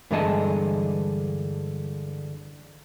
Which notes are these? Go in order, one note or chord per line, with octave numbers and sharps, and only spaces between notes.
G2 D3 E3 G#3 D#5 A5